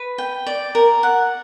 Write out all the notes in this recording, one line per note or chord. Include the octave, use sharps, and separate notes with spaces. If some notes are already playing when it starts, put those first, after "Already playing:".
Already playing: B4
G5
D5
A#4
F#5